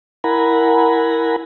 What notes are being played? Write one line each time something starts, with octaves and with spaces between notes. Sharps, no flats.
E4 A#4 F#5 G#5 A#5 B5